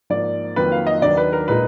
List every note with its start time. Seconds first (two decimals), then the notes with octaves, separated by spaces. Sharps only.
0.10 G#2 F3 A#3 D5
0.56 F2 D#3 F#3 A#3 F4 B4
0.72 F5
0.87 D#5
1.02 D#2 D#3 F#3 D4 D5
1.17 B4
1.33 A#4
1.48 A#2 G#3 D#4 B4